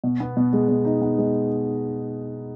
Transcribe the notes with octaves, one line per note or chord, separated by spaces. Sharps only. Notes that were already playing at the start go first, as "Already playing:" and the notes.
B2
B3
B2
G#3
B2
D#4
B3
G#3